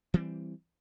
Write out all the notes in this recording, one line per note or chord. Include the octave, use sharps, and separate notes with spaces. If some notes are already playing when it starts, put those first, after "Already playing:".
E3 G3 C4